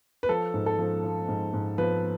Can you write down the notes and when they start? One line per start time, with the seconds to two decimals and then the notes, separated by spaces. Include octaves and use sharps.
0.23 B4
0.29 F3 A4
0.54 G#2
0.66 A4
0.79 F3
1.04 F3
1.29 G#2
1.53 G#2
1.78 F3 B4